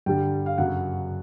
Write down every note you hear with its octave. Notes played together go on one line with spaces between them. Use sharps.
G2 D3 G3 G5
F5
F#2 C#3 F#3 F#5